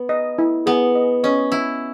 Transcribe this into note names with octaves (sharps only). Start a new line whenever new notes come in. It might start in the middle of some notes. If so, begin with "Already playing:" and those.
Already playing: B3
D#5
E4
B3 G#4
D#5
C#4 D#5
E4 B4